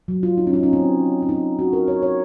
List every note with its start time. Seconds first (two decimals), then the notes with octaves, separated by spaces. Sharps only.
0.08 F#3
0.23 F4
0.38 D#4
0.47 C#4
0.53 D#4
0.63 C#4
0.73 C4
1.23 C#4
1.29 D#4
1.59 F#4
1.73 A#4
1.88 C#5
2.03 C#5